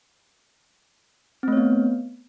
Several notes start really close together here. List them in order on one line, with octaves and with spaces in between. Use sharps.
C4 A3 C#5 B3